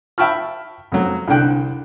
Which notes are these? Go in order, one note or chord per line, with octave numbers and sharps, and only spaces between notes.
E5 G5 A5 B5 C#6 F6
F2 F#3
C2 D3 D4 G5 F#6